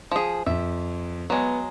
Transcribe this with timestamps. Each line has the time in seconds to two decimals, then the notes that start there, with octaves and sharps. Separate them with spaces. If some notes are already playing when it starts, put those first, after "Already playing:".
0.11 F3 G#4
0.46 F2 E5
1.30 F#3 G#3 B3